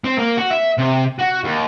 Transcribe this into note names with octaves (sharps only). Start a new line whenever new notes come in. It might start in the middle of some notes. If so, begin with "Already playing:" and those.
C4
A#3
F#4
E5
C3
F#4
D#2